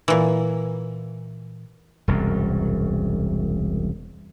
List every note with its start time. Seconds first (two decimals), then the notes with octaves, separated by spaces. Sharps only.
0.08 A#2 E3
2.08 E1 C2 F#2